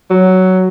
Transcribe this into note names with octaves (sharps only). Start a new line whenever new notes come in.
F#3